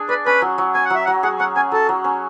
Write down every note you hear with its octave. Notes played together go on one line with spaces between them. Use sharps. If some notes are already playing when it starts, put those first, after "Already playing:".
Already playing: D4 G#4
B4 D5
C#4 B4
F#3
F#3
C#4 G#5
F#5
F#3 E5
F#3 F#5
G#4 F#5
C#4 F#5
C#4 G#5
F#3 A4
F#3
C#4